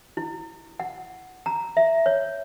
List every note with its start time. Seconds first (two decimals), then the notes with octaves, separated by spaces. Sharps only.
0.17 E4
0.80 F#5
1.46 A#5
1.77 E5
2.06 C#5